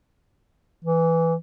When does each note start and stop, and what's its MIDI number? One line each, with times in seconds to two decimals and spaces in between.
0.84 1.34 52